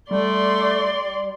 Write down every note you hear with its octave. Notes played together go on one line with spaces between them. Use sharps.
G3 A3 D5 C6